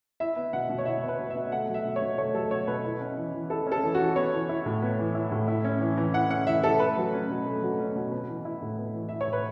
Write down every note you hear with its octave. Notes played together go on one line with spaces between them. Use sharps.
E4 E5
B3
B2 F#5
B2
C#5
E4 E5
B3
B4
B2
E5
B2
A3 F#5
F#3
E5
B2
C#5
B2
A3 C#5
F#3 A4
B2 C#5
B2 B4
E4
C#4
E3
E3
E4 A4
C#4
A4
E3
F#4
E3
B3 C#5
E3
E4
A2
B3
E3
E4
A2
E4
C#4
E3
E3
E4 F#5
C#4 F#5
E3 E5
E3 A4
A3 B4
F#3
C#4
B2
A3
F#3
C#4
B2
B3
E3
E4
A2
B3
E3
E4 E5
C#5
A2
B4